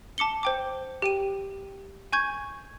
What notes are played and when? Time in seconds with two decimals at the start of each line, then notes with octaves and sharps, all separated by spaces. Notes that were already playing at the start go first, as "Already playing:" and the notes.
0.18 A5 D6 C#7 G7
0.43 C5 G5 D6
1.02 G4 G5 D#7
2.13 G#5 C#6 G6 G#6